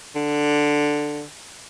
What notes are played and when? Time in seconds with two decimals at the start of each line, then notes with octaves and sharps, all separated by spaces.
0.15 D3